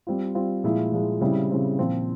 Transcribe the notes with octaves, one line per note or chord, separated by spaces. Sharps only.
G3 C4 F4
G3 C4 F4
A#2 F3 G#3 E4
A#2 F3 G#3 E4
C#3 G3 C4 E4
C#3 G3 C4 E4
A#2 F3 C4